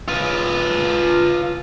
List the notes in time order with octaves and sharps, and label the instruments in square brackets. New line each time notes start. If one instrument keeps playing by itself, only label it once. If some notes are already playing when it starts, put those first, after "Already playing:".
[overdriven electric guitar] F4 B4